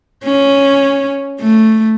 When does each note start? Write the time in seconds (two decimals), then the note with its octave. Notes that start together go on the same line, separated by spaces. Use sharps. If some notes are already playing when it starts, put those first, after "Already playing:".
0.24 C#4
1.40 A3